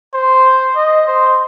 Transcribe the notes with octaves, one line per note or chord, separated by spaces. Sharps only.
C5
D#5
C5